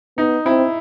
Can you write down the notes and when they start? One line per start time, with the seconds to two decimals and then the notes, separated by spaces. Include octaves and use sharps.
0.17 B3 D#4
0.45 C4 E4